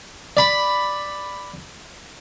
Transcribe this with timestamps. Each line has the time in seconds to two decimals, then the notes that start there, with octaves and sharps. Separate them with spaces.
0.37 D5 B5